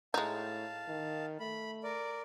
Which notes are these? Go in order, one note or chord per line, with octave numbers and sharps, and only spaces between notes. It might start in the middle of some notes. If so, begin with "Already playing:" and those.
A2 G#3 D#4 F5 A5
D#3
A3 B5
A#4 D5